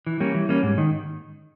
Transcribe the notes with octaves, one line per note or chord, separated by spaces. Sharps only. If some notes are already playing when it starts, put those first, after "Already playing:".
E3
G3 A#3 C#4
E3
G3 A#3 C#4
G#2
D#3